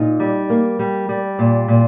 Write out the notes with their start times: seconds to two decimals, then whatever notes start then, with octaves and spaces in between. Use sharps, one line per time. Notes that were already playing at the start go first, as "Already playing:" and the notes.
Already playing: A#2 D#4
0.20 G3
0.50 A#3
0.79 G3
1.09 G3
1.39 A#2
1.68 A#2